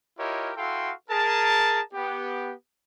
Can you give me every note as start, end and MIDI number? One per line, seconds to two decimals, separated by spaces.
0.18 0.51 64
0.18 0.51 65
0.18 0.51 67
0.18 0.51 70
0.18 0.51 73
0.18 0.51 75
0.56 0.91 64
0.56 0.91 66
0.56 0.91 69
0.56 0.91 77
0.56 0.91 79
0.56 0.91 84
1.10 1.80 68
1.10 1.80 70
1.10 1.80 81
1.94 2.52 59
1.94 2.52 67